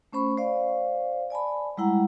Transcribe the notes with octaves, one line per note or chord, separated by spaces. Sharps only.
A3 C#4 C5 B5 C#6
C5 D5 F5
D5 G#5 A5 B5
G3 G#3 E4 F#5 A#5